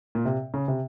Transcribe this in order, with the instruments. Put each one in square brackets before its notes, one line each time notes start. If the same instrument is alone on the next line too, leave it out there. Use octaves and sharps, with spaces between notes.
[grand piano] A#2
C3
C#3
C3